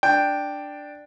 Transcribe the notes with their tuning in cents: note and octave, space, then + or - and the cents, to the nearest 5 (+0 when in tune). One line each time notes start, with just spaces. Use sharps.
D4 +5 G5 +0